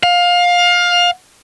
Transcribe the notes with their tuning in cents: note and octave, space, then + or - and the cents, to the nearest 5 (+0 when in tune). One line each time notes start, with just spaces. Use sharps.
F5 +20